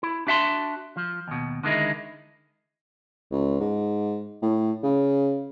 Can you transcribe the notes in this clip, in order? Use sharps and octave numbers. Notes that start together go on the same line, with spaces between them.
E4
D4 F#4 E5 F5 A5 C6
F3
D#2 B2
D3 D#3 G#3 D#4 E4
C#2
G#2
A2
C#3